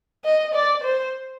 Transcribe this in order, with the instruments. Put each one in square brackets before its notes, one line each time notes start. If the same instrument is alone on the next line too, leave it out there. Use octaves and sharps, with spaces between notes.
[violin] D#5
D5
C5